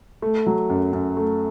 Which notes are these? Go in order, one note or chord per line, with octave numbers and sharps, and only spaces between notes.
A3
F#3
F#2
F#2
A3